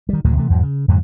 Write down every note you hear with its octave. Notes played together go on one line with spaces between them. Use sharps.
D#3 G3
D2 A2 D#3 F#3
C3 E3 A3
E2 G#2 F#3
C#3
F2 G#2 D3 F#3